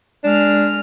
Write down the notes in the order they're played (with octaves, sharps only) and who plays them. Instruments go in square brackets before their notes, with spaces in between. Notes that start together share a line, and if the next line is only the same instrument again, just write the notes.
[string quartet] G#3 F6 [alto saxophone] D4